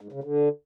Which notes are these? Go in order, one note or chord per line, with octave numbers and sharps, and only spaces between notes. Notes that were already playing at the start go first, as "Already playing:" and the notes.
G#2
C#3
D3